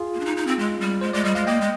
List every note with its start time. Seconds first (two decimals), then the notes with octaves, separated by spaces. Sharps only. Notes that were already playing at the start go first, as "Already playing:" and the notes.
Already playing: F4 G#4
0.15 A#3
0.20 D4
0.25 D#4
0.37 D#4
0.47 C4
0.59 G#3
0.81 G3
1.01 G#3 C5
1.13 G#3 D5
1.24 G3 D#5
1.35 G#3 F5
1.47 A#3 D#5 G5
1.61 G#3